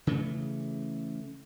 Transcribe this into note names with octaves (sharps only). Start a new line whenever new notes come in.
C#3 E3 A3